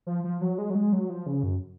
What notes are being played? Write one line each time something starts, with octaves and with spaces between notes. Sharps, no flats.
F3
F3
F#3
G#3
F#3
G#3
F#3
F3
C#3
F#2